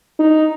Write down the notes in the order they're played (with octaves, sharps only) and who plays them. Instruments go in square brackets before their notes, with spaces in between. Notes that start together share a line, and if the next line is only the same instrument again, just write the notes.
[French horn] D#4